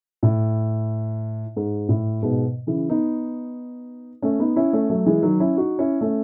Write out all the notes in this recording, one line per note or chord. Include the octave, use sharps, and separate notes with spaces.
A2
G#2
A2
G#2 B2
C#3 E3
B3 D#4
A3 C#4
B3 D#4
C#4 E4
A3 C#4
F#3 A3
E3 G#3
D#3 F#3
C#4 E4
D#4 F#4
C#4 E4
A3 C#4